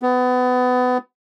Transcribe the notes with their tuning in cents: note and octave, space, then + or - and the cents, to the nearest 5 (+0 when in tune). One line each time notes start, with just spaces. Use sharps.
B3 +25